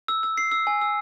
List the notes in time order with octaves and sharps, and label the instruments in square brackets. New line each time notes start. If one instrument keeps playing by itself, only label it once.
[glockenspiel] E6
E6
C7
E6
G#5
E6